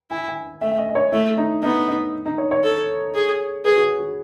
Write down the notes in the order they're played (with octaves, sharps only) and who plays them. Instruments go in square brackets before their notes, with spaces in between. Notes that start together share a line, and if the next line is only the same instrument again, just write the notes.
[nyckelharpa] E4 [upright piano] G#5
[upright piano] G#5
[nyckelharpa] A3 [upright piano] E5
[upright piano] E5
D#5
D#5
C#5
[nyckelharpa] A3 [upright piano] E4
[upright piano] D#4
[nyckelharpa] B3 [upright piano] D#4
[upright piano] D#4
D#4
C#5
C#5
[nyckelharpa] A4
G#4
[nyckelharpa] G#4 [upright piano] B4
[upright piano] F#4
G#4
F#4